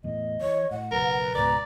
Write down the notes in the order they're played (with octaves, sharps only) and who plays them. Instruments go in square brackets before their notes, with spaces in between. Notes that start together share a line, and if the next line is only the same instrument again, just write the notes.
[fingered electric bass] E2 A2 [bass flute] D#5
[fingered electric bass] E3 [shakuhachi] C#5
[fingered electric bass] A2 [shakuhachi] F#5
[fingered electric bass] F#1 B1 [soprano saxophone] A#4 [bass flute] B4
[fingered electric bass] C#2 G#2 B2 [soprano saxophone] D5 [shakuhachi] A#5